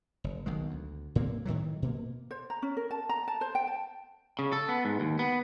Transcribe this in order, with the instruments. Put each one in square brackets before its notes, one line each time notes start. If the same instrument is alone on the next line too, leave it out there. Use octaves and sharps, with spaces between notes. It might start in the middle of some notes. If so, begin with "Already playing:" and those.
[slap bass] F#1
B1 D#3 G#3
D2
A2 A#3 C4
A2 D#3 E3 F#3
B2 A#3
[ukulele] C5
A#5
C#4
A#4
A5
A#5
A5
C5
G5
A5
[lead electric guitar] C#3
A4
B3
G#2
D#2
B3